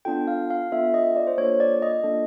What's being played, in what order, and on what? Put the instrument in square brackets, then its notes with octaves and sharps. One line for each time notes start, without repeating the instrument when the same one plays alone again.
[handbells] B3 D4 F4 A4 G5
F5
F5
B3 D4 F4 A4 E5
D#5
D5
C5
A#3 D4 F4 A4 C#5
D5
D#5
A#3 D4 F4 A4